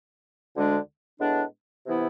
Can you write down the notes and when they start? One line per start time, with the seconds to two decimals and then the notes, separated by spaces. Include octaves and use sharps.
0.54 D2 D3 G#3 D4
1.20 A2 G#3 B3 D4
1.86 C3 E3 B3 E4